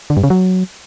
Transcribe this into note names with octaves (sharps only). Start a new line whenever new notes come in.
D3
G2
C#3
F#3